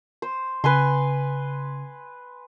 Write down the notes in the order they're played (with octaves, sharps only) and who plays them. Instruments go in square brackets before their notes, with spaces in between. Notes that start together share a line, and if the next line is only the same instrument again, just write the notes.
[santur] C5
[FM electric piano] C#3 [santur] B4 G#5 C6